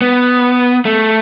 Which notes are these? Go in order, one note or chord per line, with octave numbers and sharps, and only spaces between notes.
B3
A3